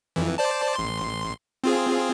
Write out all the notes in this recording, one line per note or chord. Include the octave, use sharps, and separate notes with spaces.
F2 E3
C5 D5 A5
A1 C6
C4 F4 G#4